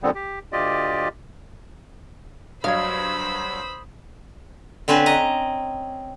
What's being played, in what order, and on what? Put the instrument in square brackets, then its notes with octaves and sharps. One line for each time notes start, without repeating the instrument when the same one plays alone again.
[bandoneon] F2 A#2 D3 G3 B3 C4
G4
D2 F4 G4 D5 D#5
[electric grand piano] G2 F#3 G#6 [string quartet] C5 B5 E6 [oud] F5 [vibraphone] D#6
[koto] D3 C4 C#4 B4
D#5 A#5